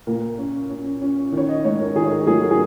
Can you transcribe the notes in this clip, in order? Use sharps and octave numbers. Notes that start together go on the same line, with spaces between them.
A#2 A#4
C#4
C#4
C#4
D#3 C#5
D#5
G#2 C#5
A#4
D#3 G#4
C#5
A#4
F#3 G#4
A#4
G#4